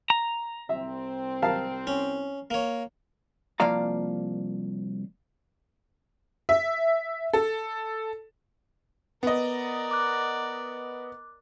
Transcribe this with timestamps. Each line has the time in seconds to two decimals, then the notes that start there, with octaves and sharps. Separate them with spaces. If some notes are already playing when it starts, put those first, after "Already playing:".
0.10 A#5
0.69 C2 C4 E5
1.42 A#4 F5 A5
1.87 C#4
2.51 A#3 C#5
3.60 C2 F3 A#3 D5 F5 A#5
6.49 E5
7.33 A4
9.23 B3 A#4 D5 D#5
9.91 D6 F#6